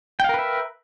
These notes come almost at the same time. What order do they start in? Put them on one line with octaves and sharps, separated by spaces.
G5 F5 A#4 B4 E5